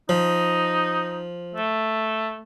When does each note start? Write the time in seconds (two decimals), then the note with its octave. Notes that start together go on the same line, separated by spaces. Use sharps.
0.09 F3 D#4
1.54 A3